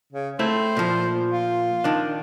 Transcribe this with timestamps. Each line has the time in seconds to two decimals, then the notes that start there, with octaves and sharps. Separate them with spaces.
0.13 C#3
0.39 A3 C4 E4 C5
0.77 A#2 F3
1.31 F4
1.84 D#3 D4